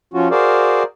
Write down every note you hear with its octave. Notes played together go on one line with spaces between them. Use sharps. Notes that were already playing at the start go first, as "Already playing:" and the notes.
F3 C#4 F4 F#4
F#4 G#4 A#4 C5 D5 F5